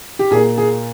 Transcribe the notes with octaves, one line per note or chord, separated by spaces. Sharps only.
G4
A#2 A#3 G#4
G#4